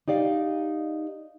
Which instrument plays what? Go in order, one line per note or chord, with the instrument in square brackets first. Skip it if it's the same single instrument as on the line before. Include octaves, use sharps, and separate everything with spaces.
[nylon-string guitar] D#4 G4 D5 F5